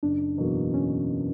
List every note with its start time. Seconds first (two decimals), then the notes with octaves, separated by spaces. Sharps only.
0.03 F#1 D4
0.38 E2 B2 F#3 A#3
0.74 C#4